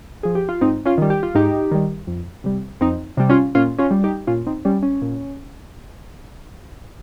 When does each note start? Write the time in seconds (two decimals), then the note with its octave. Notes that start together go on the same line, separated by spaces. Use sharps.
0.23 F3 G#4
0.35 G4
0.49 F4
0.61 G#2 C4 D#4
0.86 C#4 F4
0.98 D#3 G3
1.10 G4
1.23 F4
1.35 G#2 D#4 G4
1.71 D#3 G3
2.07 F2
2.44 C3 G3
2.81 F2 C4 D#4
3.17 C3 G3
3.30 C#4 F4
3.55 A#2 C#4 F4
3.79 C#4 F4
3.91 G3
4.04 D#4 G4
4.27 A#2 C#4 F4
4.47 C4 D#4
4.65 G3 C#4
4.83 C#4
5.02 A#2